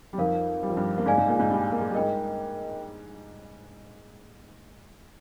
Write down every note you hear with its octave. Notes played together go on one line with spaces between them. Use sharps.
G3
F2 F3 D#4 A#4 F5
G3
F3
G2 G3
A#3
G#2 G#3 G#4 D5 F5 G#5
G#2 G#3
A#2 A#3
G#2 G#3
G2 G3
A#3
G#3
G3
G#2 G#3 A#4 D#5 G5